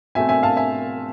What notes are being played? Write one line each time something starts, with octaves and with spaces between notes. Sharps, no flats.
B2 A3 C4 E5 G#5
E5 G#5
F5 A5
E5 G#5